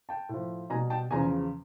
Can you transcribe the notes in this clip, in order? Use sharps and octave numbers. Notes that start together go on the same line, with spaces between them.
G5 A5
A2 F3
B2 G3 G#5 A#5
G5 A5
E2 C#3 F3 G#5 A#5